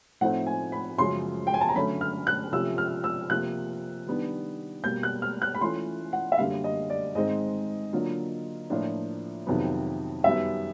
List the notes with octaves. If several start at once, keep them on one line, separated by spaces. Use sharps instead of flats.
A2 F3 A3 C4 D#4 F#5
G#5
B5
F#2 C#3 F3 G#3 C6
G5
G#5
A5
A#5
D3 F#3 A3 C#4 B5
F6
F#6
C3 F3 A3 C#4 F4 E6
F6
E6
C3 F3 A#3 F#6
D#3 G3 B3 D4
B2 G3 A#3 G6
F#6
F6
F#6
B5
E3 A3 C#4 F4 C6
F#5
E5
F#2 D3 G3 A#3 F5
D#5
D5
G#2 D#3 G#3 C4 D#5
D3 F#3 A#3 D4 F4
A2 F3 A#3 D4 F4
F2 C3 D#3 F#3 B3
F#2 D#3 G3 B3 E5